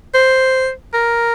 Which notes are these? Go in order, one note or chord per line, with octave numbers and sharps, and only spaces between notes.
C5
A#4